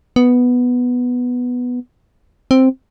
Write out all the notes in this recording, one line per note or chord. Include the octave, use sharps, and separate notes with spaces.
B3
C4